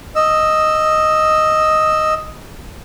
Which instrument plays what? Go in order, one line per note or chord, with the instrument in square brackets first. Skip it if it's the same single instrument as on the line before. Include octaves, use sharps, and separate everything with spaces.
[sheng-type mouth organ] D#5 E6